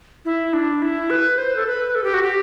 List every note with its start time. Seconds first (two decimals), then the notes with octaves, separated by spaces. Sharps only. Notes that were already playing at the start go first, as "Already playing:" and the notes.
0.25 E4
0.53 D4
0.82 E4
1.10 B4
1.38 C5
1.56 A4
1.67 B4
1.95 A4
2.04 G4
2.14 F#4
2.22 G4